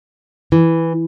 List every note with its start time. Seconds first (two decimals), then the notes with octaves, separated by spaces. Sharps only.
0.52 E3